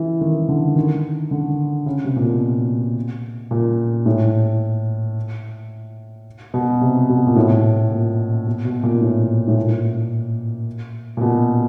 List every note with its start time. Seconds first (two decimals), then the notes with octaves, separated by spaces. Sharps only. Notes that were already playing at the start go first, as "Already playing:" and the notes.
Already playing: E3
0.21 D#3
0.49 D3
0.76 D#3
1.31 D3
1.86 C#3
2.05 C3
2.16 A#2
2.22 B2
3.51 A#2
4.06 A2
6.54 B2
6.81 C3
7.09 B2
7.27 A#2
7.36 A2
7.92 A#2
8.46 B2
8.65 B2
8.83 A#2
9.01 A2
9.48 A2
9.57 A#2
11.17 A#2
11.21 B2